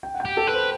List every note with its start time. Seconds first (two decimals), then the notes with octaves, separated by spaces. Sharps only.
0.03 G5
0.14 F#5
0.20 G5
0.25 G4
0.37 A4
0.47 B4
0.54 C5